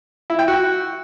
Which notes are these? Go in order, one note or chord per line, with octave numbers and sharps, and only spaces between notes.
E4
G5
F#4